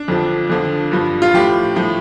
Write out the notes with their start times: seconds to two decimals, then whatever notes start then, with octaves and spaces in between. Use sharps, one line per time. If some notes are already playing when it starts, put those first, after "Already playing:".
Already playing: D4
0.08 F2 D3 F3
0.50 F2 D3 F3
0.92 G2 F3
1.22 F4
1.34 A2 F3 G4
1.76 A2 F3